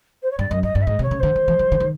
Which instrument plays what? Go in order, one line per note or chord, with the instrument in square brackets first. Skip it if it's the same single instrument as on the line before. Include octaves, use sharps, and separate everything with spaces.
[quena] C5
C#5
[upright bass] G2 [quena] D5
[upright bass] F#2 [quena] D#5
[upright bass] G2 [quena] D#5
[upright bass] G2 [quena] D5
[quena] E5
[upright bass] G#2 [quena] D#5
[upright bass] C3
[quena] C#5
[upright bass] C#3
[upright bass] D3 [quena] C5
[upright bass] D#3
E3
E3
D3
D#3